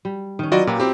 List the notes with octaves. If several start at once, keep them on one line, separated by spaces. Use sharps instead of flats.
G3
D#3 C#4
F#3 F4 F#4 B4 D5 D#5
A#2 G4 A#4 B4
C4 E4 G4